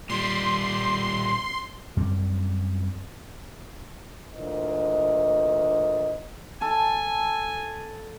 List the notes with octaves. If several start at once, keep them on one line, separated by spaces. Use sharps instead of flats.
A#2 G3 C6
F#2 G3 C4
D2 A#2 E3 C5 D#5
A4 G#5